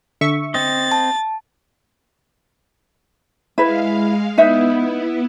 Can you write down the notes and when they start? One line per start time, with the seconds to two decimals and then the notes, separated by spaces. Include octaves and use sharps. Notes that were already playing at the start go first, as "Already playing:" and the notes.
0.21 D3 E5 C#6
0.54 C4 D#5 A6
0.92 A5
3.58 G#3 E4 B4 F5
4.38 B3 D#4 E4 B4 E5